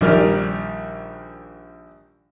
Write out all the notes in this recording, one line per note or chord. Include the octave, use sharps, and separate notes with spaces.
A#1 D#3 G3 A#4 D5 F6